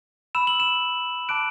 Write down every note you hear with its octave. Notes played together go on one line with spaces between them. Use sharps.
B5 E6 E7
F#7
E7
A5 D6 F#6 D7